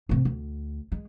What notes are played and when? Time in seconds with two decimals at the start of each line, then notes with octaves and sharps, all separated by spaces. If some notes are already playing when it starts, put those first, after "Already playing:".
0.09 A2 C3
0.25 D2
0.92 G#3